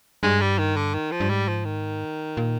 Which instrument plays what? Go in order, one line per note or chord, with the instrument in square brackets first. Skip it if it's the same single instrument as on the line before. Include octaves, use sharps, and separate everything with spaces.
[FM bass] G2 [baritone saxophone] G#3
[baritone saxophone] G3
D#3
D3
D#3
F3
[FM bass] G2
[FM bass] G#2 [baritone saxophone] G3
[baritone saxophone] F3
D#3
[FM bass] A#2